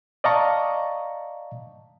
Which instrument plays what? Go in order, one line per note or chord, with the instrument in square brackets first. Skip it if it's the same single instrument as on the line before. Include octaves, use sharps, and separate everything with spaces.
[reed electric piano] D5 D#5 F5 A5 A#5 C#6